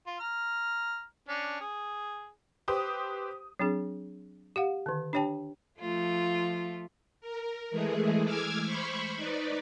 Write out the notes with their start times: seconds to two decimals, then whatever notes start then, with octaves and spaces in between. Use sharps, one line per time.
0.06 F4
0.20 A#5 F6
1.28 C#4 D4
1.61 G#4
2.68 G4 B4 C5 D#6
3.59 F#3 C4 D4 G#4
4.56 G4 F5 F#5
4.86 D3 D#3
5.13 D4 G4 C#5 G5 A5
5.80 F3 A3 F4
7.21 A#4
7.71 E3 G#3 A3 G#4
8.24 D6 E6 F6 G#6
8.66 C5 B5 C#6
9.17 D#4 B4 D5